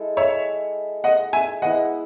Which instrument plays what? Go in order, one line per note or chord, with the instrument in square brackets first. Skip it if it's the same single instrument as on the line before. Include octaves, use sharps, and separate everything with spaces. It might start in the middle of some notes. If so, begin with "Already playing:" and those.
Already playing: [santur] G#3 E4 A4
[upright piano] C#5 E5
D#5 F#5
E5 G#5
[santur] G#3 B3 E4 [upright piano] D#5 F#5